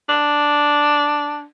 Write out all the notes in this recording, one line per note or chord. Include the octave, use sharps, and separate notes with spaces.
D4